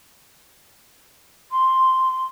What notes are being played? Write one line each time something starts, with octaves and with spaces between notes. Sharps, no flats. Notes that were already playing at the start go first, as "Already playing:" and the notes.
C6